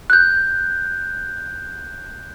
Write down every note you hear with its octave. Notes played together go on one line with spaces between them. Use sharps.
F#6 G6